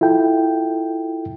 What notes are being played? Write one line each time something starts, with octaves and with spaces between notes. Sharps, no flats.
E4 F4 A4 G5